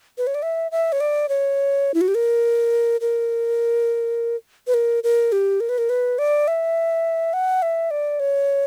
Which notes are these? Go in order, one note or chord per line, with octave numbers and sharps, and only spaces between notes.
B4
C#5
D5
E5
E5
C#5
D5
C#5
E4
F#4
G4
A#4
A#4
B4
A#4
A#4
G4
A#4
B4
A#4
B4
D5
E5
F#5
E5
D5
C#5